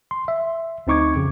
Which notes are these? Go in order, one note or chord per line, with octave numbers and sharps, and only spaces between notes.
C6
E5
D2 C4 D#4 C#6 D6 G#6
F2 C#3